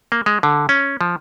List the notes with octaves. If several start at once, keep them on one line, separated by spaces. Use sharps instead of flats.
A#3
G#3
D3
C#4
F3